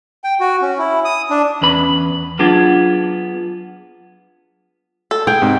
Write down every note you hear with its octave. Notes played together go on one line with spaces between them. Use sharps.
G5
F#4
C#4
E4
D#6
D4
E2 C#4 B4 B5
F#3 B3 D4 F4 G#4
A4
G#4 G5
G#2 C3